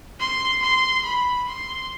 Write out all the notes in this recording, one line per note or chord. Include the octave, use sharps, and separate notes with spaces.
C6
C6
B5
C6